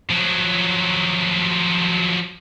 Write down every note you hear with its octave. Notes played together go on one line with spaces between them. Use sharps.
F3 F#3